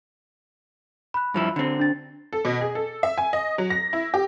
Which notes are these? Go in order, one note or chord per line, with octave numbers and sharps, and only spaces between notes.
B5 F#6
G2 F3 E4
D3 C4
D4 A6
A4
B2
G#4
A4
E5
G#5
D#5
F#3
A#6
E4
G4